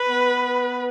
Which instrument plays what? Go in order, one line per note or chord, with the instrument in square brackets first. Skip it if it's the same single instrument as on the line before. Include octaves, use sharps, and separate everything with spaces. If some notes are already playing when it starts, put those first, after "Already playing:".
Already playing: [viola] B4
[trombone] B3